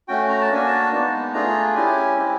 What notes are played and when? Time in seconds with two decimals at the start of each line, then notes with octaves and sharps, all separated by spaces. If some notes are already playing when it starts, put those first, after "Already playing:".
0.08 A3 C#4 F#4 G5
0.29 A#5
0.42 A5
0.50 A#3 D4 F#4 G#5
0.67 A5
0.91 G#3 B3 D#4
1.33 A3 D4 F4 G#4 A#5
1.74 C#4 E4 G4 G#5
2.17 G#3 C4 E4 G4